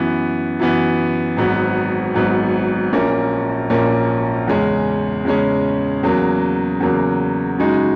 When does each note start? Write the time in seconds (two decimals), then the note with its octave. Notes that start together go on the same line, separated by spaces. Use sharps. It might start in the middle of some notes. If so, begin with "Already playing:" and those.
Already playing: F#2 E3 B3
0.59 F#2 E3 B3
1.37 G#1 G#2 F#3 B3
2.14 G#1 G#2 F#3 B3
2.93 A#1 A#2 A#3 C#4
3.70 A#1 A#2 A#3 C#4
4.47 E2 C#3 G#3 C#4
5.25 E2 C#3 G#3 C#4
6.03 E2 C#3 F#3 A#3
6.80 E2 C#3 F#3 A#3
7.58 F#2 C#3 G#3 D#4 F#4